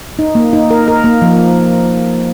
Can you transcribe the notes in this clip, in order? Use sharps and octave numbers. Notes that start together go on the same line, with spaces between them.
D#4
A#3
D#4
A#4
A#4
A#3
F3